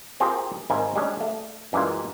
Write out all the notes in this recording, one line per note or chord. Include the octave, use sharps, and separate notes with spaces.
C4 F4 G4 G#4 A#4
G#1 C3 G3 A#3 D#4 G#5
G3 G#3 C#4 D4
A3
F#2 E3 G3 G#3 A#3 F4